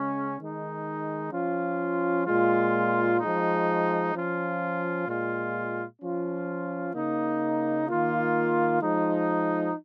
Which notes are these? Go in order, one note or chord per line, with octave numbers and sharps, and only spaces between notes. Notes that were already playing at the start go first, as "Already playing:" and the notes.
Already playing: C#3 G#3 C#4
D#3 G#3 D#4
F3 C#4 F4
A#2 G#3 F4
F3 G#3 D#4
F3 C#4 F4
A#2 G#3 F4
F3 C#4 F4
C#3 A#3 D#4
D#3 A#3 F4
F3 G#3 D#4